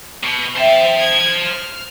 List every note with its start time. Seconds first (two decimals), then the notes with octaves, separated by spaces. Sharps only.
0.23 B2
0.56 C4 C5 E5 A5
0.99 G#6
1.42 F6